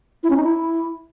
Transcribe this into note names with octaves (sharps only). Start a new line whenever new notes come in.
E4
C#4
D#4
E4